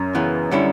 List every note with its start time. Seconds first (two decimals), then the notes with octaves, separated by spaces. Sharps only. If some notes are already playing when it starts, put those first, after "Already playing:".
Already playing: F#2
0.15 C#3 E3 B3
0.51 D3 G3 C#4 E4